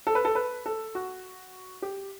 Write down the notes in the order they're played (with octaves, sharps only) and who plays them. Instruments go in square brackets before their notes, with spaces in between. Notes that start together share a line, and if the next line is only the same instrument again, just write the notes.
[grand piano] A4
B4
A4
B4
A4
F#4
G4